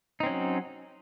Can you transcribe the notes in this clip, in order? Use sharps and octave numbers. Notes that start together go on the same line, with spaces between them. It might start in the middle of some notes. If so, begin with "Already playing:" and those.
F#3 C4 C#4 D#4